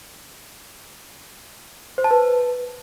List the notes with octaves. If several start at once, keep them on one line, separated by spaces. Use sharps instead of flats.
C5
A5
B4